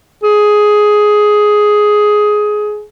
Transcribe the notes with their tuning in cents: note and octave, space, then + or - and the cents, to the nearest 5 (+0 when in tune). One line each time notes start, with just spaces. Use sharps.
G#4 +10